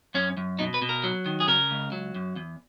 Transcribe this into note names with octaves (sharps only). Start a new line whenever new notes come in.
F#2 C#4
F#2
B2 D#4
B4
B2
A#4
F#3
D#3
G#4
C#3 A#4
C#2
F#3
F#2
E2